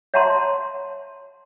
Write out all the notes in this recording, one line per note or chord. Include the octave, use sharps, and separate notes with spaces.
C#5 E5 F#5 A5 A#5 C6